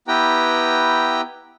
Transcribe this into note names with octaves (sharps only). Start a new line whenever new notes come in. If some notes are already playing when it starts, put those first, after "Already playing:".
B3 E4 G4 B4 G5 A#5